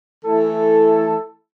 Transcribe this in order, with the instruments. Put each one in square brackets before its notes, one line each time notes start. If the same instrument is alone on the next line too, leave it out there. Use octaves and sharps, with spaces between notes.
[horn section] E3 A3 E4 A4